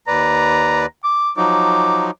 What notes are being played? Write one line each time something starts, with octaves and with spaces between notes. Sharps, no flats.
D#2 B4 D5 A#5
D6
F3 F#3 D#4 D6